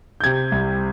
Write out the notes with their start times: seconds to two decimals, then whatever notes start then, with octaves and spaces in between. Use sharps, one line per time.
0.20 G6
0.24 C3 G#6
0.52 C2